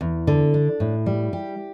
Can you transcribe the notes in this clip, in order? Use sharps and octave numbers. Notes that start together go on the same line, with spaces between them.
E2
D3
D4
A2
G3
G4